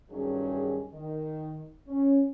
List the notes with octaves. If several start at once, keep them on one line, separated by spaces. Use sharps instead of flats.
G2 D#3 F#3 C#4 G#4
D#3
C#4